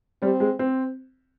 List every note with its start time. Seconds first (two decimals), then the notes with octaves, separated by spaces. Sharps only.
0.22 G3 C4
0.40 G#3
0.59 C4